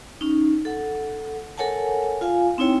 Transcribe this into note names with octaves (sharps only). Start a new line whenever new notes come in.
C#4 D#4
A4 F#5
A4 A#4 C#5 F#5 G#5 A5
F4 F5 G#5
C4 D#4 E4 C#5 G5